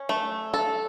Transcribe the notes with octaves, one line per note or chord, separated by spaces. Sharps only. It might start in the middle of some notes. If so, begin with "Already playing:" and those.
Already playing: C#4
A3
A4